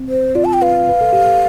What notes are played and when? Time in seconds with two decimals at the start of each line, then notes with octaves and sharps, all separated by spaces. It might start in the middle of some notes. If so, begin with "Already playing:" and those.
Already playing: C4
0.08 C5
0.35 F4 D5
0.45 A5
0.53 G5
0.62 B4 F5
0.89 B4
1.01 A4
1.13 G4
1.24 A4